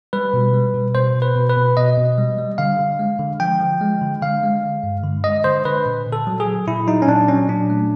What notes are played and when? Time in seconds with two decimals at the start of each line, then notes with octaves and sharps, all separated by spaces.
0.13 G3 B4
0.34 B2
0.54 G3
0.74 B2
0.95 B2 C5
1.15 B2
1.22 B4
1.36 B2
1.50 B4
1.57 B2
1.77 B2 D#5
1.97 B2
2.18 G3
2.38 G3
2.58 D3 F5
2.79 D3
2.99 G#3
3.19 D3
3.40 F3 G5
3.60 F3
3.81 G#3
4.02 D3
4.22 D3 F5
4.43 G#3
4.63 G#3
4.83 G2
5.04 D3
5.24 G#3 D#5
5.44 D3 C5
5.65 D3 B4
5.86 A#2
6.06 A#2
6.13 A4
6.27 F#3
6.40 G#4
6.47 F#3
6.67 A#2 E4
6.87 F#3 D#4
7.02 C#4
7.08 A#2 D4
7.28 F#3 C#4
7.49 A#2 D4
7.70 A3